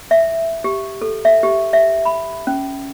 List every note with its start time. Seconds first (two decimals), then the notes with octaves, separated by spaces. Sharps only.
0.11 E5
0.64 G4
1.02 A4
1.25 E5
1.43 G4
1.73 E5
2.05 B5
2.47 C#4